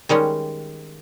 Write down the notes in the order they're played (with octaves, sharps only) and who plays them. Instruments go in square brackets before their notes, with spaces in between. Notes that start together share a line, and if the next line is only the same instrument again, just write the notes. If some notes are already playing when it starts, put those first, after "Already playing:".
[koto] D#3 G3 G#3 C#4